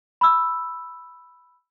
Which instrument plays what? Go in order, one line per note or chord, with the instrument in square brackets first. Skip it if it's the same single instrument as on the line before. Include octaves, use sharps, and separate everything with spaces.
[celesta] B5 E6